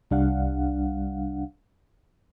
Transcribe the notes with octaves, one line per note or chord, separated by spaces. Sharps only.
C2 G3 D4 F5 F#5